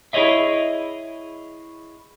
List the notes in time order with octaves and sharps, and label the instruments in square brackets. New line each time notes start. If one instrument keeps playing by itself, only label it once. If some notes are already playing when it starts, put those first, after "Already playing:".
[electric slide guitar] E4 G#4 C5 C#5 D#5 E5